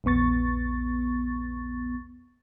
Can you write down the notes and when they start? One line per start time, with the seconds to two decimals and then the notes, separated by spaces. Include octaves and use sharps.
0.04 A#1 E2 B3 C#6 A6